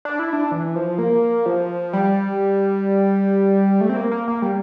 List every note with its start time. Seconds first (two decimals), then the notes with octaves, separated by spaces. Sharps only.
0.05 D4
0.19 E4
0.33 D4
0.52 E3
0.76 F3
0.98 A#3
1.46 F3
1.93 G3
3.81 A3
3.89 C4
3.97 A#3
4.12 A#3
4.28 A#3
4.42 G3